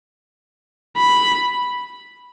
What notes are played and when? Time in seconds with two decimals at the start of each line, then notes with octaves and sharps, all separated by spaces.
0.98 B5